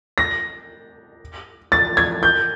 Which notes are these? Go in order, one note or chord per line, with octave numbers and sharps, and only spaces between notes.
A#6
A6
G#6
G6